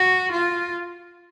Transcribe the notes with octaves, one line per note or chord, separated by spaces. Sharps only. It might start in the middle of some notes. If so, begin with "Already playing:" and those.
Already playing: F#4
F4